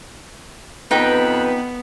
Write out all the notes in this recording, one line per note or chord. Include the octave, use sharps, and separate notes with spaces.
F2 B3 D#4 B4 G5